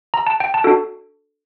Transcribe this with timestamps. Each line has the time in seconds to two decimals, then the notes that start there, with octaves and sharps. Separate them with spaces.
0.14 A#5
0.27 A5
0.40 G5
0.54 A5
0.64 D4 F#4 A4